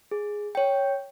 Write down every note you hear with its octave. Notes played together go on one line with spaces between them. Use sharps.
G#4
C#5 G5